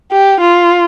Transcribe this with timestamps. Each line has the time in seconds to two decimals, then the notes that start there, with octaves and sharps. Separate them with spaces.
0.12 G4
0.41 F4